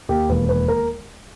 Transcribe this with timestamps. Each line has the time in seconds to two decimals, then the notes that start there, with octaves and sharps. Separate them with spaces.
0.09 D#2 G4
0.29 E1 B4
0.49 D#2 B4
0.68 A#4